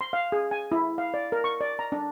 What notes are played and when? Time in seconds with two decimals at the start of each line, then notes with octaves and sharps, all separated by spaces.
0.01 C6
0.13 F5
0.32 G#4
0.51 G#5
0.72 E4
0.98 F5
1.14 D5
1.32 A#4
1.44 C#6
1.61 D5
1.79 A#5
1.92 D4